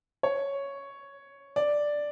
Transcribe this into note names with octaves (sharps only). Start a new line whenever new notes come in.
C#5
D5